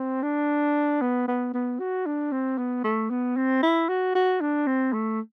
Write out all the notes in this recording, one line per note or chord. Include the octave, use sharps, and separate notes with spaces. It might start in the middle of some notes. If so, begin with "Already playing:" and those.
Already playing: C4
D4
B3
B3
B3
F#4
D4
C4
B3
A3
B3
C4
E4
F#4
F#4
D4
C4
A3